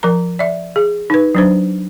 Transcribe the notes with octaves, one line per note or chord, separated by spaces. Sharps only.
F3 A#4 A#5
D5 E5
G#4
D#4 B4
F#3 D4 C5